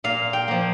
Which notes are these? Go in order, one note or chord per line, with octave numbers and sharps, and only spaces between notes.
A#2 F5
G5
F3 A#3